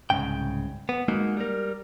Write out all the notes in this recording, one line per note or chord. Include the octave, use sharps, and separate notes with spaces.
C2 G#2 C#3 G5
B3
G#3 A#3 D#4 F#4
G3 A#4